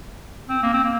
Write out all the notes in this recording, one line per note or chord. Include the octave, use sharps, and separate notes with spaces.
C4
A#3
C4
A#3